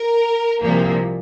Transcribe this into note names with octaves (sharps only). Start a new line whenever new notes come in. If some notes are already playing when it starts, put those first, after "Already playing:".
Already playing: A#4
C2 A#2 F3 A#3